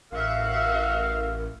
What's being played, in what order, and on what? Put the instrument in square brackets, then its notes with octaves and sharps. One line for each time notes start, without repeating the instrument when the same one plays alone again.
[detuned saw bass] A1 [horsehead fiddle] F#4 E5 [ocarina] A#4 [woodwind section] F5